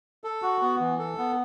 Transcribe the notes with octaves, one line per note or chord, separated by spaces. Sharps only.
A4
F#4
B3
E3
A4
B3